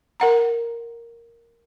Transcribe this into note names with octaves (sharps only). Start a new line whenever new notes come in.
A#4 F#5 A#5